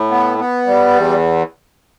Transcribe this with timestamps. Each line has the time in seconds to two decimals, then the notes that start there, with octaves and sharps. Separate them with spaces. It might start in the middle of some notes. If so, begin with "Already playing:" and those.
Already playing: A2
0.10 B3
0.38 B3
0.66 G3
0.94 E2